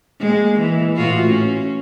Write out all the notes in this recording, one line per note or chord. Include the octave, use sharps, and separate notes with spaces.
G#3 A#3
E3
A2 F4 F#4
C#4